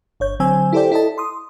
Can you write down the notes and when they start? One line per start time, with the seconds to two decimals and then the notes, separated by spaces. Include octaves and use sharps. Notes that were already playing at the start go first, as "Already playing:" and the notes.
0.20 G1 C#5 G6
0.40 D3 F#3 C4 C5 G#5 E6
0.73 E4 G4 A4 C5 D5 G5
0.92 E4 A4 D#5 A5
1.18 C6 D#6